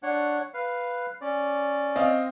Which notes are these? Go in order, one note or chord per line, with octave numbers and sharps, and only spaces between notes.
D4 C#5 F#5
B4 F5
C#4 D5
C4 D#5 F5